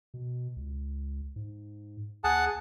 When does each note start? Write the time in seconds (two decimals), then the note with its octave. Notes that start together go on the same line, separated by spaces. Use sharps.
0.14 B2
0.56 C#2
1.36 G#2
2.24 D#2 G#4 F#5 A5